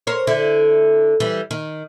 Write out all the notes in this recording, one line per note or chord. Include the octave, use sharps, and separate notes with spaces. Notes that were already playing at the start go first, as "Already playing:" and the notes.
A#4 C5 C#5
D3 E4
E3 G3
D#3